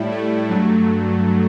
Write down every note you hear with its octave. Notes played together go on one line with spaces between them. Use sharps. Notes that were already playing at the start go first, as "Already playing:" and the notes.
Already playing: A2 G3 E4
A3
G2 F#3